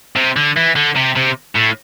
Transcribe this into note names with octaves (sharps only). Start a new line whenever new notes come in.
C3
D3
E3
D3
C3
C3
A2